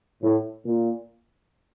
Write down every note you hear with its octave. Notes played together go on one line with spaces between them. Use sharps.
A2
A#2